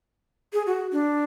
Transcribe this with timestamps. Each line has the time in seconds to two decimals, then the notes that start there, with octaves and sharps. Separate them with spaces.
0.53 G#4
0.67 F#4
0.92 D4